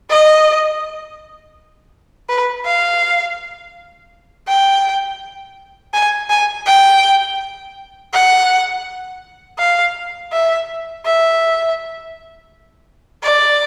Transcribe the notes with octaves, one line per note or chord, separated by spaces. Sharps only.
D#5
B4
F5
G5
G#5
G#5
G5
F#5
F5
E5
E5
D5